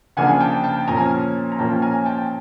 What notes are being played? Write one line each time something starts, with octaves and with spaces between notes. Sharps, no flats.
C#3 F3 A#3 D4 F#5 G#5
G5 A5
G5 A5
A#2 F3 A#3 C#4 G#5 A#5
A#5
A#2 F3 A#3 C#4 G5 A5
G#5 A#5
G5 A5